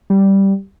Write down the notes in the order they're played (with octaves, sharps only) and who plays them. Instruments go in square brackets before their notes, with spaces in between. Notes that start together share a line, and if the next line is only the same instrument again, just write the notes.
[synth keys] G3